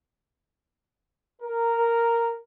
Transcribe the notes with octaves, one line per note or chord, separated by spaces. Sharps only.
A#4